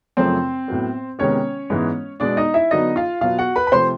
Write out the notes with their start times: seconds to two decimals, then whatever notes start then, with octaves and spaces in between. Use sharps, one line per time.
0.17 F#2 C#3 F3 A3 C4 C5
0.68 A2 F#3 B3
1.19 C3 D#3 G#3 B3 C#4 C#5
1.70 G#2 E3 G#3 B3
2.20 B2 G#3 B3 D4 D5
2.37 D#4 D#5
2.54 E4 E5
2.71 D3 F#3 B3 D#4 D#5
2.96 F4 F5
3.21 B2 F#3 B3 F4 F5
3.39 F#4 F#5
3.56 B4 B5
3.67 B5
3.72 C3 F3 A3 C5 C6